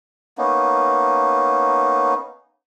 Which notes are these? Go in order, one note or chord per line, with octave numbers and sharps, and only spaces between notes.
A#3 B3 C#4 D#4